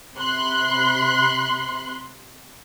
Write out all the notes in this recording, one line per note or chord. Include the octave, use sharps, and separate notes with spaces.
C3 B5 C6 F#6